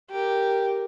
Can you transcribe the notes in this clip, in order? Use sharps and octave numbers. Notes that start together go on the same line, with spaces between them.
G4 A#4